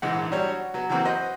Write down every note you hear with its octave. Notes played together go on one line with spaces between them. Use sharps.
A#1 G#2 E3 G#3 F#5
F#3 G3 D4 C#5
F#4
F#3 B3
E3 F#3 A#3 C4 F#4
F#4 B4 C5 D#5